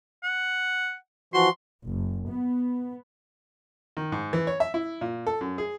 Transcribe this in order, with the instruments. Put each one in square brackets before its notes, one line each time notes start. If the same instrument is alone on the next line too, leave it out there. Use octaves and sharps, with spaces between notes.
[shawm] F#5
[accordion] E3 F3 F#4 [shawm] C6
[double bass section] F#1
B3
[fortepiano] D#3
G#2
E3
C#5
E5
E4
A#2
A4
F#2
G#4